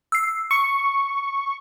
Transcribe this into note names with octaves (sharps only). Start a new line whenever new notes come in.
E6 C7
C#6 C#7